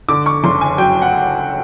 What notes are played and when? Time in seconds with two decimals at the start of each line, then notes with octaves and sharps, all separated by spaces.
0.09 D3 D6
0.26 C#6
0.44 F#1 C6
0.61 G#5
0.78 F#3 G5
1.02 F#5